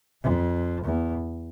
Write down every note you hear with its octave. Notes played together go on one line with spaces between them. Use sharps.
F2
E2